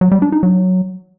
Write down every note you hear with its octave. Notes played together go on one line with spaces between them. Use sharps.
F#3
G3
D4
D#4
F#3